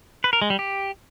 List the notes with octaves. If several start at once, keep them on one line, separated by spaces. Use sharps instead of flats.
B4
A#4
G#3
G3
G4